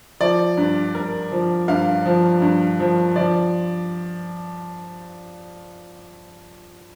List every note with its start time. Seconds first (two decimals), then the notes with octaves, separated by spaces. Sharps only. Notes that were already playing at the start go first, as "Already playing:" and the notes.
0.20 F3 D5
0.57 G2
0.95 G2 A#4
1.32 F3
1.68 G2 F5
2.06 F3
2.42 G2
2.80 F3
3.16 F3 D5